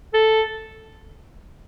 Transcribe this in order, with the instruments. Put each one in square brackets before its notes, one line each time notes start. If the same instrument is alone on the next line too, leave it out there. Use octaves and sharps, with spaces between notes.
[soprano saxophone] A4